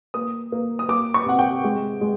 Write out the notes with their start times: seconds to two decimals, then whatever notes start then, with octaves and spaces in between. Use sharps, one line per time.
0.14 A#3 D#6
0.52 A#3
0.79 D#6
0.89 A#3 D6
1.14 C#6
1.26 C3 F#5
1.39 G5
1.64 G#3
2.01 G#3